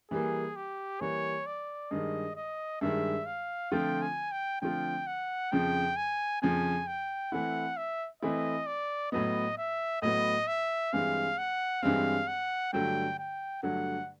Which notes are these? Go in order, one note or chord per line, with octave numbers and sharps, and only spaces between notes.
E3 G3 A#3 G#4
G4
E3 G3 A#3 C#5
D5
G2 D#3 G#3 D#5
D#5
G2 D#3 G#3 E5
F5
D3 F3 A3 C4 F4 G5
G#5
G5
D3 F3 A3 C4 F4 G5
F#5
F2 C#3 F3 G5
G#5
F2 C#3 F3 G#5
G5
E3 A3 C4 E4 F#5
E5
E3 A3 C4 E4 D#5
D5
A2 F#3 B3 D#5
E5
A2 F#3 B3 D#5
E5
G2 E3 G#3 C4 F5
F#5
G2 E3 G#3 C4 F5
F#5
G2 D3 F#3 A3 G5
G5
G2 D3 F#3 A3 F#5